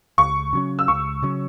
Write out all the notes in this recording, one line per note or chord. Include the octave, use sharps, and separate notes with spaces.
C#2 C#6
C#3 F#3 C#4
E6
C#2 C#6
C#3 F#3 C#4